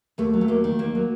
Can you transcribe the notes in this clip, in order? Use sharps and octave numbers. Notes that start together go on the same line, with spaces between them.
D#2 A3
F#3
A3
D#2 A#3
D#3
D#2 A#3
F#3